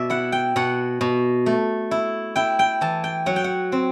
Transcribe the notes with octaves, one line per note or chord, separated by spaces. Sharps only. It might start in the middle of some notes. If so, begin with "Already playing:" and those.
Already playing: B2 D5 E5
E4 F#5
G5
B2 F#5
B2
A3
E4
E4 G5
G5
E3 A5
G5
F#3 F#5
G5
F#5
C4